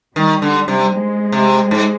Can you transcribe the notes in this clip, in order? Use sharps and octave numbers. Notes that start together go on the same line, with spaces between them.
D#3 G3
D3
C3
G#3
C3
G#2